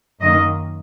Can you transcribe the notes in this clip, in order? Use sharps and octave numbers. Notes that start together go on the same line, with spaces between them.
F#2 D#3 A#3 D#5